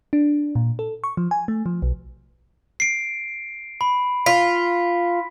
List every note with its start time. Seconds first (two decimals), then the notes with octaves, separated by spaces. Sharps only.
0.13 D4
0.55 A#2
0.79 A4
1.04 C#6
1.17 F3
1.31 G#5
1.48 A3
1.66 F3
1.82 B1
2.80 C7 D7
3.81 B5
4.26 F4 B6